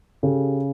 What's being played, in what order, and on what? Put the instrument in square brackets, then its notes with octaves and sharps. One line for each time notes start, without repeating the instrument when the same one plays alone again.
[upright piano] C#3 G4 A4